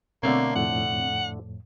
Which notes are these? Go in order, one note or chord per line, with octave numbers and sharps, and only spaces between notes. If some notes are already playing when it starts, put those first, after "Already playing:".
B2 D3 A3 A#3 C4 C#5
F2 A2 F#5